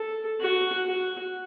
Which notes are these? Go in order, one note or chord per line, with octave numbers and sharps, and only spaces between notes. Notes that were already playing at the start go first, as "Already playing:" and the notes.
Already playing: A4
F#4
F#4